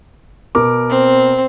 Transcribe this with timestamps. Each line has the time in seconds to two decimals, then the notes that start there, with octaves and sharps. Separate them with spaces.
0.55 B2 A#4 D6
0.90 C4